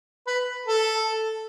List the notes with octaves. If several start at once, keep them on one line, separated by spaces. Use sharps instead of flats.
B4
A4